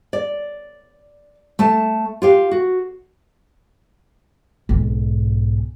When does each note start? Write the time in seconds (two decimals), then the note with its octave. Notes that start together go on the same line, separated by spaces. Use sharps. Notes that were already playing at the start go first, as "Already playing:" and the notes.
0.13 D5
1.59 A3 A5
2.22 F4 G4 F5
2.51 F#4
4.69 B1 G#2